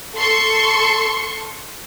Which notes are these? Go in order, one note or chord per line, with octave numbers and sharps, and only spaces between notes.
A4 C6 C#6 C#7